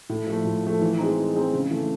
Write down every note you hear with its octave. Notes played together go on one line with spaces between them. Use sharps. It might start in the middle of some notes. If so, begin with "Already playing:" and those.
A2
F3 A3
A2
F3 A3
E3
G#3 C4 D#4
E3
G#3 C4 D#4
C#3
E3 A3